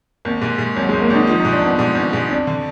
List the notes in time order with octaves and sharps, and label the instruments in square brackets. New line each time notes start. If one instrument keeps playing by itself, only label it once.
[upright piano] G#1 [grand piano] A#3
[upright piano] G#2
G#2
[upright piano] G#1 [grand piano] F#3
[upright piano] G#1 [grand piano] G#3
[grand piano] A#3
[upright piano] G#1 [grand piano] D#4
[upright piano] F3 [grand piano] D#4
[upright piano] G#2 [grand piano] D#4
[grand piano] D4
[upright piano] G#1 [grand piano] B3
[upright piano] G#2
G#1
G#2
[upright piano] F2 [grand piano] D4
[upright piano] D3